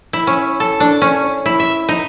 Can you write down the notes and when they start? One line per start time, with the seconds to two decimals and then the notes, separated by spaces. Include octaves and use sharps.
0.13 E4
0.27 C#4
0.60 A4
0.80 D4
1.02 C#4
1.46 E4
1.60 E5
1.89 D#4